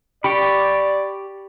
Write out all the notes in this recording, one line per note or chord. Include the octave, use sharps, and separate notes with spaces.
G4 D5 B5 C#6